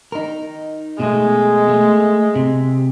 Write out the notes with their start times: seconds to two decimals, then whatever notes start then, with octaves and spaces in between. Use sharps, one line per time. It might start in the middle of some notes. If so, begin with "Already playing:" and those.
0.12 D#4 A#4
1.00 B2 G#3 A3
1.69 A3
2.36 C3